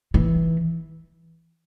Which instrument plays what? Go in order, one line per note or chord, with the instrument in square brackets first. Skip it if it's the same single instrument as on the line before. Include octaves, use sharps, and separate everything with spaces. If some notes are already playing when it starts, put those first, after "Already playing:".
[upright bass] E3